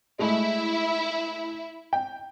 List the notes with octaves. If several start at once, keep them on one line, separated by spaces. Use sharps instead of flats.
G#3 A3 E4 E5
G5